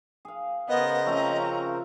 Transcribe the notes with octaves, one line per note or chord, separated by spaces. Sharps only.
G#4 F5
C#3 B3 A#4 C5 D#5
F3 A3 C4 C#4 A#5